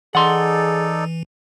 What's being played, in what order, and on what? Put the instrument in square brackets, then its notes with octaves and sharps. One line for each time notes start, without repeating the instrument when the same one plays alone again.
[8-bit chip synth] E3 [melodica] D#4 A4 D5 [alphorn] G#4 [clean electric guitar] F#5 C6